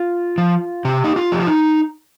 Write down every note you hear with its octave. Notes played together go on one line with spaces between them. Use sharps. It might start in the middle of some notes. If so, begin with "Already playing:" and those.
Already playing: F4
F3
C3 G4
D#4
F4
F3 G4
F4
D#4